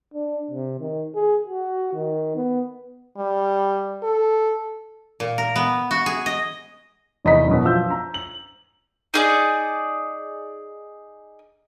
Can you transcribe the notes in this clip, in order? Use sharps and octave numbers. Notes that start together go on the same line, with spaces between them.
D4
C3
D#3
G#4
F#4
D#3
B3
G3
A4
A#2
A#4
B3
F#4
G#4
D#5
F1 E2 D#5 A#5 B5 B6
A1 F#2 B2
F3 F4 E6 G6
A#5
F#7
D#4 G#4 D5